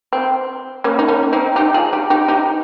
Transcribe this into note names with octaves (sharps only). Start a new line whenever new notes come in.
C4
A#3 C#4
D#4
A#3 C#4
C4 D#4
D#4 G4
F4 G#4
D#4 G4
D#4 G4
D#4 G4